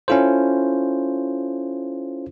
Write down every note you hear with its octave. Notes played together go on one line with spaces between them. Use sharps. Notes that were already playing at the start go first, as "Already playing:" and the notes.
C#4 E4 F4 A4 C5